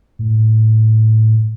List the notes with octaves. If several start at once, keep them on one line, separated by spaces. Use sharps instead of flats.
A2